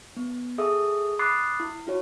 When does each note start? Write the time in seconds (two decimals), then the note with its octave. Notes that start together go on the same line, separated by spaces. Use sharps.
0.17 B3
0.58 G#4 A4 E5 D#6
1.19 B5 D6 D#6 F#6 A6 C7
1.60 E4
1.87 E4 F#4 C#5